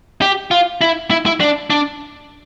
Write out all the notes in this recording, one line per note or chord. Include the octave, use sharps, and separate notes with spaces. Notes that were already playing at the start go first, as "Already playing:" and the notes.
G4
F4
E4
E4
E4
D4
D4